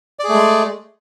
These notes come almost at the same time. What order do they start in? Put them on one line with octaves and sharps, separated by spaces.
D5 G#4 A3 G#3